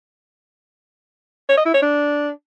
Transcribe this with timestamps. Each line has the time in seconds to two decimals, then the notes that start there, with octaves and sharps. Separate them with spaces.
1.49 C#5
1.57 D#5
1.66 E4
1.74 C#5
1.82 D4